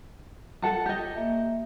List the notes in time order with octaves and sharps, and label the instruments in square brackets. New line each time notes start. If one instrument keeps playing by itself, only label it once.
[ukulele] A4 F#5 A5
G4 D#5
[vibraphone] A#3 E5